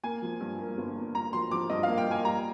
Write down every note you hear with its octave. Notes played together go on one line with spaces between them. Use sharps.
A#3 G#5
F3
G2
A#3
G1
A#3
G2 A#5
F3 C6
F3 D6
G2 D#5
F5
A#3
G5
A#3 G#5
G3 A#5